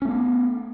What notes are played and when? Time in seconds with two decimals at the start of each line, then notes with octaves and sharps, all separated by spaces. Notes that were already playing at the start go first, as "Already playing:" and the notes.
0.02 C#4
0.05 A3
0.09 B3